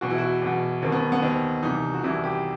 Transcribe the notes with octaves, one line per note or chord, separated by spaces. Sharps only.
E2 B2 F#4
E4
F#4
E2 B2
D#2 D#3 C4
B3
B3
D#2 D#3 C4
C2 C3 E3 D#4
F#4
C2 C3 E3 E4
G4